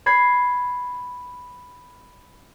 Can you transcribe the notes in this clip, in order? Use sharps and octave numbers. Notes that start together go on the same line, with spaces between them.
B5 G#6 C7